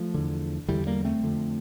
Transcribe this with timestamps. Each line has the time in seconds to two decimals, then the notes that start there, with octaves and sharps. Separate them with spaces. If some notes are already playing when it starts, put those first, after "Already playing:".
Already playing: F3 A3
0.14 E2 D3
0.68 E2 D3 E3 G3
0.87 G3 A#3
1.05 A3 C4
1.23 F2 D3